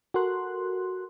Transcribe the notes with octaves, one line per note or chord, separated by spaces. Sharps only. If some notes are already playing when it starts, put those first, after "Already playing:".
F#4 A4 A#4 C6 F#6